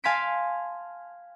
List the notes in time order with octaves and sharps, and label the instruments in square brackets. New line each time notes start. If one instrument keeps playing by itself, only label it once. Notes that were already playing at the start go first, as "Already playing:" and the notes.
[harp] F5 G#5 A5 C6 B6 D7